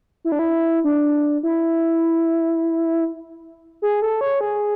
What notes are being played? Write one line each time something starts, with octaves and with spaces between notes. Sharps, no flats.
E4
D4
E4
D4
E4
G#4
A4
C#5
G#4